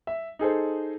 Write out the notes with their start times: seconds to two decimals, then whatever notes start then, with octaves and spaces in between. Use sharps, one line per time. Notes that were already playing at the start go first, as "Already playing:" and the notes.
0.07 E5
0.39 D#4 G#4 A4 C5